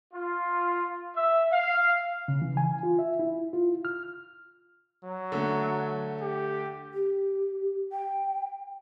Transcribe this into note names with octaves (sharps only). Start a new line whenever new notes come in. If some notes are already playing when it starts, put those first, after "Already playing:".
F4
E5
F5
C#3
E3
G#5
F4
E5
E4
F4
F6
F#3
D3 A3
G4
G4
G5